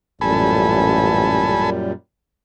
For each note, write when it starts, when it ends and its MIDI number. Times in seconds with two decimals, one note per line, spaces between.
0.21 1.64 33
0.21 1.92 42
0.21 1.92 46
0.21 1.92 55
0.21 1.70 69
0.21 1.70 80
0.21 1.70 83